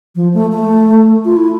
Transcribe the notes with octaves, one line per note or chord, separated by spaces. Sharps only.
F3
A3
A3
F4
E4